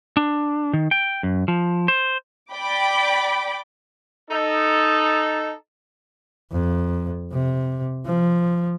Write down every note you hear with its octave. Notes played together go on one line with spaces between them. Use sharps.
D4
D#3
G5
F#2
F3
C5
D5 G5 B5 D6
D#4 A4
F2
C3
F3